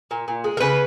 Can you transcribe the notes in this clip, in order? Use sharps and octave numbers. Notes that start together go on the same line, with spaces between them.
A#2
A#2
G#3
A#4
C#3 B4